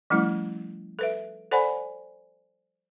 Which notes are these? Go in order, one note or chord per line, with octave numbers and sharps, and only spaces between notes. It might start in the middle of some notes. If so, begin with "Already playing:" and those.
F3 G3 A3 C#4 E4
A4 B4 E5
A4 C5 D5 F#5 G#5 B5